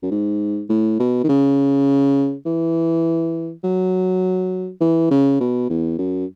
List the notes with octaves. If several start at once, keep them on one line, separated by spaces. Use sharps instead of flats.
F#2
G#2
A2
B2
D#3
C#3
E3
F#3
E3
C#3
B2
E2
F#2